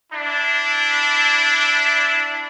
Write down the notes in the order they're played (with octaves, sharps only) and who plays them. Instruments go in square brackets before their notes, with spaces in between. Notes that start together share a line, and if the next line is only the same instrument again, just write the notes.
[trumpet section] D4 E4